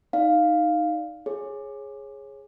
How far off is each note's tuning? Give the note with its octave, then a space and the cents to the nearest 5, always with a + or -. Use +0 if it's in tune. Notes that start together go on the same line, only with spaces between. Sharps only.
D#4 +0 D5 +0 F5 +0
G#4 +0 C#5 -15